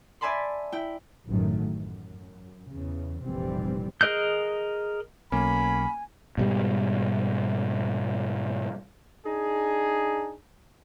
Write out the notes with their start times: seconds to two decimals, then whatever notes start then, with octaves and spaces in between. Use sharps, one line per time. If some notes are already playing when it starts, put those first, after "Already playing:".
0.21 D5 E5 G#5 A5 B5 C6
0.72 E4 G5
1.27 A1 F#2 A2 D#3 F#3 A3
1.59 F#2
2.68 E2 C#3
3.23 F1 A#1 C3 E3 G3 C4
4.01 G#4 A#4 D#5 F#6 G6
5.32 B1 A#3 C#4 G#5 B5
6.37 G#2 B2 G3
9.26 D4 D#4 G#4